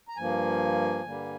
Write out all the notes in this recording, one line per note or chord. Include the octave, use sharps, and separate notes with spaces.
A#5
G2 F3 A#3 G#5
G2 D3 G3 A#3